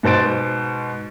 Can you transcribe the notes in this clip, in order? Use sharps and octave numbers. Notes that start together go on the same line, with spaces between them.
G#2 B2 C5 A6 D7